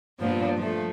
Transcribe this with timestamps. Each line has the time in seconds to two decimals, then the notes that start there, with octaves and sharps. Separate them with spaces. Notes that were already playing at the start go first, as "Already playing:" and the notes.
0.19 G2 A#2 F3 B3 D4
0.57 F3 A3